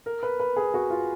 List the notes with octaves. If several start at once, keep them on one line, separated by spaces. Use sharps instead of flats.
A#4
B4
B4
G#4
F#4
F4